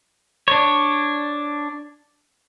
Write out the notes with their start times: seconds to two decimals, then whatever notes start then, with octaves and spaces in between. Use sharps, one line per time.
0.48 D4 C#5